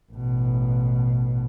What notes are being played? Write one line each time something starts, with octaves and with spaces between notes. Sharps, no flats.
A1 B2